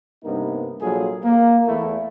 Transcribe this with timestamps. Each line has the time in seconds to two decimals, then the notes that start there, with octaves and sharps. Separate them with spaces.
0.24 G2 C3 A#3 B3 D#4 A#4
0.82 A#1 F#3 F4 G#4 A4
1.24 A#3
1.67 E2 A3 E4